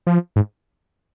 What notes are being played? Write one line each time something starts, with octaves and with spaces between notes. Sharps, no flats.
F3
G#2